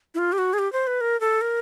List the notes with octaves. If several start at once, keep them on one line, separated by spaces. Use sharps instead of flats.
E4
F4
G4
F#4
G#4
G4
C5
B4
A#4
A4
A#4